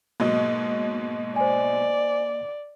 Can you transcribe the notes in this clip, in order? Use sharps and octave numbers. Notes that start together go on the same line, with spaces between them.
G#2 B2 F#3 A#3 D#5
C5 D5 G#5